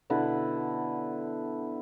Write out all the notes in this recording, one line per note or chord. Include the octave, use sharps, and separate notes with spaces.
B2 D3 E4 B4